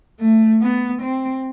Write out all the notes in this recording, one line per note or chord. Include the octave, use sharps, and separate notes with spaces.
A3
B3
C4